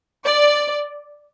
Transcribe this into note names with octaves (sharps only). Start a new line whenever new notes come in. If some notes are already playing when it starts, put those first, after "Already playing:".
D5